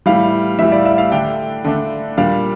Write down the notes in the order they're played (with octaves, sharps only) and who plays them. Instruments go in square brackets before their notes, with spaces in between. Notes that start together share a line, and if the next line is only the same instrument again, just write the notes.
[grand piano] A2 E3 G3 F5
A2 E3 G3 E5
D5
E5
F5
D3 A3 D4 G5
D3 A3 D4
A#2 G3 D4 F5